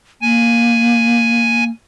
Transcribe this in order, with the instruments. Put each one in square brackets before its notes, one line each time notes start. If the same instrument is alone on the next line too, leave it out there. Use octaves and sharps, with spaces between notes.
[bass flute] A#3 [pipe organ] G#5